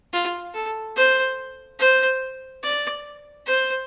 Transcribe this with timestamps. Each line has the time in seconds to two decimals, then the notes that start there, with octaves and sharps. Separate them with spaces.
0.13 F4
0.55 A4
0.96 C5
1.79 C5
2.63 D5
3.46 C5